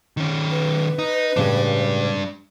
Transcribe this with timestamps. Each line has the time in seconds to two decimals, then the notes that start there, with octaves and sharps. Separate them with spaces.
0.17 D#3 C#4
0.51 B4
0.99 D#4
1.36 A2 C#3 G3 G#3 D4